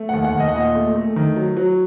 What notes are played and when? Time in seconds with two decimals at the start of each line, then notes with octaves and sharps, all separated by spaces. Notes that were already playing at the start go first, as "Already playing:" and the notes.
Already playing: A3
0.09 F#5
0.14 D#2
0.24 F#5
0.35 D#2
0.40 D#5
0.48 F#5
0.55 A#2 D#5
0.75 A3
0.95 A3
1.16 D#3
1.36 F#3
1.57 F#3